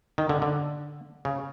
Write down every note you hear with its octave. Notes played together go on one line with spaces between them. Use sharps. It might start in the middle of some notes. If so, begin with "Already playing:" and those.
D#3
D3
D3
C#3